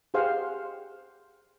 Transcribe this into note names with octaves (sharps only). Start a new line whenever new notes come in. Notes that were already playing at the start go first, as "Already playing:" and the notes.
G4 G#4 C5 F5 F#5